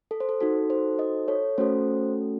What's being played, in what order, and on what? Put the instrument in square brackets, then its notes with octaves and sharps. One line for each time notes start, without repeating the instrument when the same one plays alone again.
[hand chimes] A4
C5
A4
D#4 F#4 A4
C5
C5 D#5
A4 C#5
A3 C#4 F#4 A4 C5